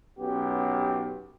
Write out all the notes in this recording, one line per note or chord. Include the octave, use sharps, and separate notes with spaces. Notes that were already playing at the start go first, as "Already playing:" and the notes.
B1 B3 C#4 G4